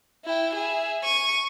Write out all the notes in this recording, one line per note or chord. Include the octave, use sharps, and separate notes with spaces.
E4 G5
G#4 E5
C#6 D#7